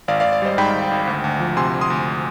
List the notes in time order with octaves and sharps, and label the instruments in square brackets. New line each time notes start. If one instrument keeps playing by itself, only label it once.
[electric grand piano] G#1 D5 F5
D5 F5
G#1
D5
G3 C5 D#5
G#2 G5 B5
G#1
G#1
D2
D2
F3
C3 G#5 C6
D2
C6 D#6
D2